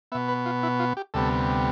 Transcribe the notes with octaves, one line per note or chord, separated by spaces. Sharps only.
B2 B3 E5
B4
F4
E4
F4
G4
D2 C3 G3 B3 A4